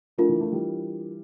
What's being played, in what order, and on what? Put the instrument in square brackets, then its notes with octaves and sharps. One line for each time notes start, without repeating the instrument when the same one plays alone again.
[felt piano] F3 A3 [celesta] D4 F4 A#4
[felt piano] E3
F3 A3
E3 G3